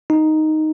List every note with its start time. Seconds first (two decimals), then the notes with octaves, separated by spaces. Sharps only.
0.10 D#4